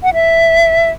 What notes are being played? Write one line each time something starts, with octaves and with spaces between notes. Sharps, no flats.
F#5
E5